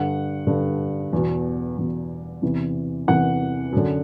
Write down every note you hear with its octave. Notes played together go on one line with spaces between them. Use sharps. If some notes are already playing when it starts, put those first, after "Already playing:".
Already playing: G2 D3 F#5
G2 D3
E2 B2
E2 B2
E2 C3 E3
E2 C3 E3 F#5
F#2 D3